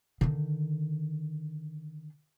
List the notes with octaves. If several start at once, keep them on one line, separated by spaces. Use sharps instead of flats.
D3 D#3